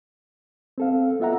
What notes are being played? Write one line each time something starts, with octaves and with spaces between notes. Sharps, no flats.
C4 A4 F5
B3 F4 E5 F#5 A#5